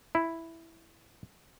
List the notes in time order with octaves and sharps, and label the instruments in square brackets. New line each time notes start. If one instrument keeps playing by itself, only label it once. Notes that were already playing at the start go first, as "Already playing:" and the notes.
[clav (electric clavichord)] E4